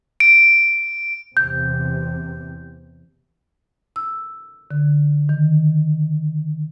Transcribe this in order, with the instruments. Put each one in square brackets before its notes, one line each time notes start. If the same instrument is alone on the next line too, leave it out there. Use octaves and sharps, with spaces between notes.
[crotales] D7
[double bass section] E2 C3 [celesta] G6
[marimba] E6
D3
D#3